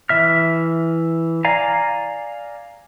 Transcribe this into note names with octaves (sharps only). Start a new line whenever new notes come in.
E3 E5 F6
D5 F5 G#5 A#5